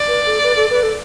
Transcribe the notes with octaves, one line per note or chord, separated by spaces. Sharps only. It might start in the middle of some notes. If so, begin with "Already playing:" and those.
Already playing: D5
B4
A4
B4
A4
B4
A4